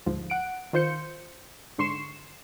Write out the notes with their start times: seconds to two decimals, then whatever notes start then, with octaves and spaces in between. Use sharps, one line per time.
0.06 D2 G#2 F3
0.30 F#5 D7
0.73 D#3 F4 C5 G6 C#7
1.78 G#2 D3 C6 C#6 C7 E7